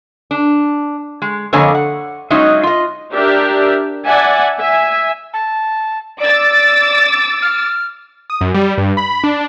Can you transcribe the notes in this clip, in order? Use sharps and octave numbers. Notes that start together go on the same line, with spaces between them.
D4
G#3
F2 D3 A#3 C#5 D#5 G#5
F#5
F#3 G#3 C#4 D#4 D#5 E5
F4 D#5
D4 G4 A#4 E5
D5 E5 F#5 G#5 A5
E5 G#5
A5
D5 D6 E6 A6
F6
D#6
F#2
G3
G2
B5
D4